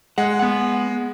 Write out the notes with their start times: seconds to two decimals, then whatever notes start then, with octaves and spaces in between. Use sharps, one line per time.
0.18 G#3 F#5
0.39 B3 F#5